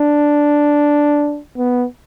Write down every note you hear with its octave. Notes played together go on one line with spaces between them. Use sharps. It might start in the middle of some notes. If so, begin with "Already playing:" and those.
Already playing: D4
B3